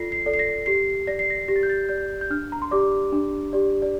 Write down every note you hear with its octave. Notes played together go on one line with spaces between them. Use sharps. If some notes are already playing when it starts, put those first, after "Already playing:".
Already playing: F4 A4 D5 A#6 C7
C7
A4 D5
C7
A#6
G4 C7
D5 A#6
C7
A#6
G4 A#6
A6
G6
A6
D5 G6
G6
D4 F6
A#5
C6
G4 D5 D6
D4
G4 D5
D5